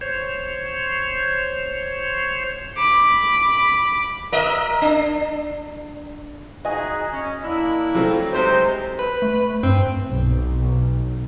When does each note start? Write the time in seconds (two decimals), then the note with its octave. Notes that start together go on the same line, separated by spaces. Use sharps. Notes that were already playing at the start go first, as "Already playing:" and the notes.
0.01 C5 C#5
2.77 B5 D6
4.32 A#4 D#5 E5
4.81 D4
6.65 D#4 F#4 G#4 D#5 G#5
7.11 C#4
7.43 A#3 D4 E4
7.95 F#3 A3 C4
8.33 C3 G#3 D#4 C5
8.99 B4
9.22 A3
9.63 G2 C4
10.06 B1